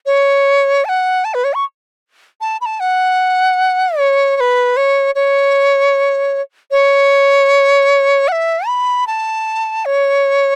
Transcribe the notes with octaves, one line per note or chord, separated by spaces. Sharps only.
C#5
A5
F#5
A5
B4
C#5
C#6
A5
B5
A5
F#5
C#5
C#5
B4
C#5
C#5
C#5
F#5
E5
B5
A5
C#5